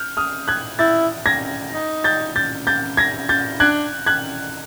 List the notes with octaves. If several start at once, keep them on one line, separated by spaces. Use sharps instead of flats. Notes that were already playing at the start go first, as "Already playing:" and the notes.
Already playing: F6 G6
D#6 F6
F#6 G#6
E4 G6 A6
G#6 A#6
D#4
G6 A6
G6 A6
G6 A6
G#6 A#6
G6 A6
D4 F#6 G#6
F#6 G#6